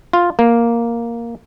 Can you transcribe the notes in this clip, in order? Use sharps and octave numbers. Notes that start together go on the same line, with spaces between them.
F4
A#3